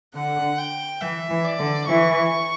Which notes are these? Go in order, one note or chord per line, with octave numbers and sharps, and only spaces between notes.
D3 F#5
G5
E3 E5
E3
D5
D3
E3 C#6